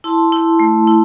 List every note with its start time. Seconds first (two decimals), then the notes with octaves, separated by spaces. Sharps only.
0.04 E4 A5 C6
0.32 E4
0.59 A3
0.87 E4